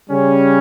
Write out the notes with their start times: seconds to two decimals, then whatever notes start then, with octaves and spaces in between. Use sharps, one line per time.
0.10 C#3 G3 C#4